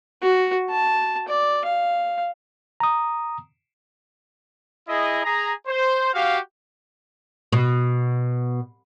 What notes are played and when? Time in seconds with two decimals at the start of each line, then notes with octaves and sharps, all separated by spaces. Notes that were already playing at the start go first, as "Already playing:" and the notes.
0.23 F#4
0.70 A5
1.28 D5
1.65 F5
2.80 A#5 D#6
4.88 E4 G#4 D#5
5.23 G#4 A#5
5.67 C5
6.13 F#4 G4 F5
7.52 B2